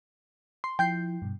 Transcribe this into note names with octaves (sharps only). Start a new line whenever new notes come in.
C6
F3 E4 G5 G6 C7
G2 B2